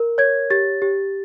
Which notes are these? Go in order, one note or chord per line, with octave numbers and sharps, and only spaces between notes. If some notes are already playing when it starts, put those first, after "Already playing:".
Already playing: A#4
C#5 G#6
G4 A6
G4